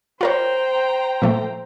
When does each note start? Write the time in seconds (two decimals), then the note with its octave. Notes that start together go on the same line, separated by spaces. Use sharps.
0.21 F4 A#4 C5 C#5 G5 A#5
1.22 A#2 F3 A3